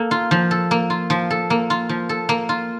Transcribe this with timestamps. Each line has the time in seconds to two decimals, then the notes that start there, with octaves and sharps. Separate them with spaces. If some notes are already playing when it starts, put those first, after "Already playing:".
Already playing: A#3 A4
0.11 F4
0.31 F3
0.51 A4
0.71 A#3
0.90 F4
1.10 F3
1.30 A4
1.50 A#3
1.70 F4
1.89 F3
2.09 A4
2.29 A#3
2.49 F4